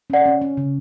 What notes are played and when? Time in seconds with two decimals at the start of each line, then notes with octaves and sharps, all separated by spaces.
0.10 C#4 D5 F#5
0.26 C#4
0.41 C#4
0.57 C#3